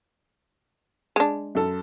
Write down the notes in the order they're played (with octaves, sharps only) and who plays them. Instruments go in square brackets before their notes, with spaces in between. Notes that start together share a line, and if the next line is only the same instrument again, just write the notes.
[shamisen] G#3 D4
[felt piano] F#2 A4